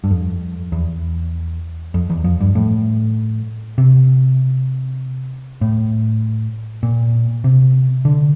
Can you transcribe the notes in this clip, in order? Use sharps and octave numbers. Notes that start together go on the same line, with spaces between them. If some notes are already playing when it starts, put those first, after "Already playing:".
G2
F2
E2
F2
E2
F2
G2
A2
C3
A2
A#2
C3
D3